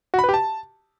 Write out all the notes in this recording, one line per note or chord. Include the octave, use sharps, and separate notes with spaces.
F#4
B5
B4
G4
A5